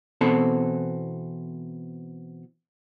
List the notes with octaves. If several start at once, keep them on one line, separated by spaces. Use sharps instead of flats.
B2 E3 C4 A4